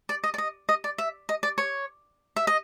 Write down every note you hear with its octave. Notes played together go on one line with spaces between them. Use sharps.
D5
D#5
D5
D#5
D#5
D5
E5
D#5
D5
C#5
E5
D#5